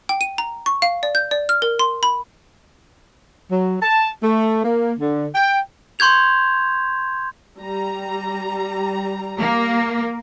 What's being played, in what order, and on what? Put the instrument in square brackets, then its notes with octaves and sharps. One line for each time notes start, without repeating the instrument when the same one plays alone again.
[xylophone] G5
D#7
A#5
C#6
F5
D5
G6
D5
F6
A#4
C6
B5
[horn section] F#3
A5
A3
A#3
D3
G5
[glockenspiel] C6 C#6 G6 G#6 F7
[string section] G3 A#5
[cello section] A#3